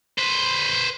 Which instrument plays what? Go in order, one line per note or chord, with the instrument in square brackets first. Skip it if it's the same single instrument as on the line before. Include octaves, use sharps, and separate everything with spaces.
[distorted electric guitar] B4 C5